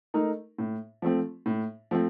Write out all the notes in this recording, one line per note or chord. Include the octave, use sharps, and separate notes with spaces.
A3 D#4 A#4
A2
F3 A3 C4
A2
F3 A3 C4